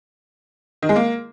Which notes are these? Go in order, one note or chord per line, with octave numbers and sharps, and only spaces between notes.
D#3
G#3
A#3